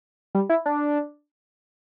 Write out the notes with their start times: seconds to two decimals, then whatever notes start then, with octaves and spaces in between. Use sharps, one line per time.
0.35 G3
0.49 E4
0.66 D4